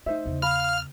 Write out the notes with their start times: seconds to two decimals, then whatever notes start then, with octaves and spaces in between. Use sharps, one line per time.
0.06 A3 D#4 C5 E5
0.26 E2 C#3
0.42 F5 A#5 B5 F6